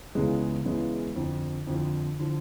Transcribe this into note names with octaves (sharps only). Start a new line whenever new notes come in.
C#2 C#3 E3 G#3 B3
C#2 C#3 E3 G#3 B3
F2 D3 F3
F2 D3 F3
D3 F3